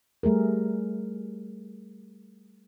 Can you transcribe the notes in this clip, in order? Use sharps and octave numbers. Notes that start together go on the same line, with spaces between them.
G3 A3 G#4 A#4